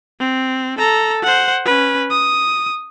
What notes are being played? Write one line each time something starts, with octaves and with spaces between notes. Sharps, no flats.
C4
A4 A#5
C5 F#5
C#4 B4
D#6